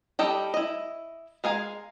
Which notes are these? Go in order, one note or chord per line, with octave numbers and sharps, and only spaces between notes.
G3 A4 D#5 G5
E4 D#5
G#3 A#4 F5 G#5